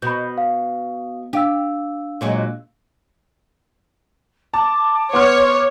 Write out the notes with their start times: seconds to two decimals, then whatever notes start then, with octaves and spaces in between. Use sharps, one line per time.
0.02 B2 B5 G6
0.38 F5
1.33 D4 G4 F5 E6
2.21 A#2 F#3 G#3
4.54 A5 D6
5.13 B3 C#5 C6 F6